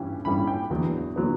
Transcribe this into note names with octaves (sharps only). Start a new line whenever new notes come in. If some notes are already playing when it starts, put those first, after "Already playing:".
Already playing: G2 E3 G3 C#4
G2 E3 G3 C#4 B5
G5
E2 D3 F#3 B3
D3 F#3 B3